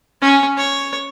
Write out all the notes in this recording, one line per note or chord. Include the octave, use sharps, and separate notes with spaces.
C#4
C#5